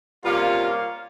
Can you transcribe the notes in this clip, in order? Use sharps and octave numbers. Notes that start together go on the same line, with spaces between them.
C3 G3 A#3 C#4 F4